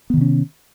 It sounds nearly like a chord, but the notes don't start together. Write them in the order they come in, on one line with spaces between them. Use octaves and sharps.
B3 D#3 C3 C#4